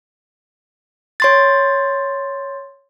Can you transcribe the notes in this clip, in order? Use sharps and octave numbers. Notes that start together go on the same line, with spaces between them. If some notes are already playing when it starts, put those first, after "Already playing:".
C#5 C6 A6